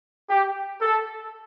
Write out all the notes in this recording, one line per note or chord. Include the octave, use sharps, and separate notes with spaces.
G4
A4